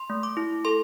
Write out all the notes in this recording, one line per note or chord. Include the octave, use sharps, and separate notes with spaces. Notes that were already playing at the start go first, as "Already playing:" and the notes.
Already playing: C6
A3
D6
E4
A4 C6